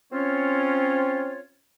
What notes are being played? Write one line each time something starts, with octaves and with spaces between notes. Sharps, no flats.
C4 C#4 F4 C#5